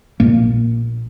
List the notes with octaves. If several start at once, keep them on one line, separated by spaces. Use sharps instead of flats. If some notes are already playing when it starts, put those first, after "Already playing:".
A#1 A#2 A#3